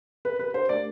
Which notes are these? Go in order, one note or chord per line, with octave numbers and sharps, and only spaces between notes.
A#4 B4
G4 B4
D4 C5
A3 D5